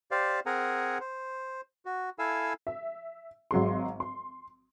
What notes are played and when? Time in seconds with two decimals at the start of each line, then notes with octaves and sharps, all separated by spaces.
0.11 G4 C5 D5 F5
0.46 C4 G#4 A#4 F#5 G#5 A#5
1.00 C5
1.85 F#4
2.19 E4 A4 F5 G#5 E6
2.67 E5
3.51 G#1 F#3 G#3 C6
4.00 C6